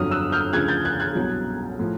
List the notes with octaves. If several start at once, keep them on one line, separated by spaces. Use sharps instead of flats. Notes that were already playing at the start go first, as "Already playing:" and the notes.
Already playing: G1 F2 D3 F#3 D#6 F6
E6 F#6
F6 G6
D2 C#3 F3 F#6 G#6
G6 A6
F#6 G#6
F#6 G#6
C2 B2 F#3
A2 F3